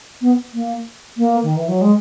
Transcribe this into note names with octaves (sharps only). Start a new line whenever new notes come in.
B3
A#3
A#3
D#3
E3
F#3
G#3